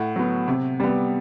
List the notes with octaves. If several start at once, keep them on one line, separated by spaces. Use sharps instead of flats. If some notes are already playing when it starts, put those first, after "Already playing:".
Already playing: A2 F#5
F#3 B3
C3
G3 B3